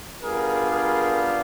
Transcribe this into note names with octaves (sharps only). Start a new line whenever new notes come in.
G3 B3 D4 F4 G#4 A#4
G#4 A#4